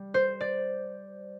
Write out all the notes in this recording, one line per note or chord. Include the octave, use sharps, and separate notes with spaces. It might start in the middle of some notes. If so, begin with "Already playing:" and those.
Already playing: G3
C5
D5